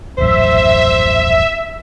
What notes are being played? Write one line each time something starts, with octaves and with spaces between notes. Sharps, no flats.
D#1 A1 F#2 C5 E5